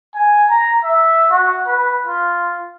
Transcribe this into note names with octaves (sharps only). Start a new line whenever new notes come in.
G#5
A#5
E5
F#4
B4
F4